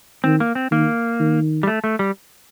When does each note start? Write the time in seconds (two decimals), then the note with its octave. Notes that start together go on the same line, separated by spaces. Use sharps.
0.24 D#3 C4
0.40 A#3
0.55 C4
0.71 D#3 A#3
1.20 D#3
1.63 G3
1.67 A3
1.84 A3
1.99 G3